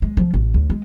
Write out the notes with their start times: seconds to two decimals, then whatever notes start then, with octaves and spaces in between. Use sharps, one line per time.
0.02 G#3
0.17 F3
0.34 A1
0.54 D2
0.70 G#3